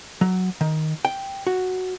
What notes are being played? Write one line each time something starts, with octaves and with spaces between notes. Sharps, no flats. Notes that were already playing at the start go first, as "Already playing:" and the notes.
F#3
D#3
G5
F#4